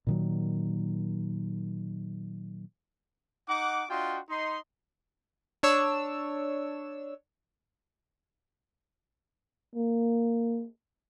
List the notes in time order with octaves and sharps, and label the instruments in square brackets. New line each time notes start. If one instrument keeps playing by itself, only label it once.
[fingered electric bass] A#2 D#3 F#3
[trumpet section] D#4 F#5 D6
D4 F4 F#4 D#5 G5 C6
D#4 C6
[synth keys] D4 C#5 E6
[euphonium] A#3